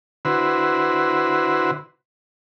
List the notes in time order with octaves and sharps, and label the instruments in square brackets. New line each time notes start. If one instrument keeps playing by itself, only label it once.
[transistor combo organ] D3 E4 F#4 B4 C5